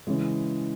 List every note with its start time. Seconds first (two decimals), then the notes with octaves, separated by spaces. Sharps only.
0.07 C#3 E3 G#3